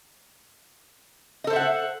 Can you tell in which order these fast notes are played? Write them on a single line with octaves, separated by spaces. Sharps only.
D#5 A4 C5 E5 F#5